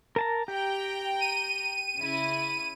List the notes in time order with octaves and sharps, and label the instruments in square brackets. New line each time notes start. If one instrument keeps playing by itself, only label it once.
[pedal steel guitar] A#4 A5 A#5
[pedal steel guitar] G4 [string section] G5 A#5
[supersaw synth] D#7
[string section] C#3 E4